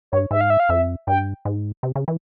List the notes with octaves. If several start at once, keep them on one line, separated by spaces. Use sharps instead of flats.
G2 C#5
G#2 E5
F5
E5
F5
F2 E5
G2 G5
G#2
C3
C#3
E3